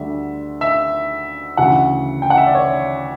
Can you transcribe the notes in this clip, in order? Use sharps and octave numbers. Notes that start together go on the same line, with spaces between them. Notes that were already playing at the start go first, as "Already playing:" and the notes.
Already playing: D2 D3 G3 E5
E5
D2 C#3 E3 F#5
G5
F#5
E5
D5
C#5